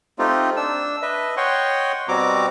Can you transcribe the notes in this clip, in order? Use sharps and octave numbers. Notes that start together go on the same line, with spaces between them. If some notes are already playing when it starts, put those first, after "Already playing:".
A3 C4 D#4 F4 G4
D4 E6
B4 D#5 E5
C#5 D#5 F#5 G5 C6 C#6
B2 G3 C4 F#4 A#5 D6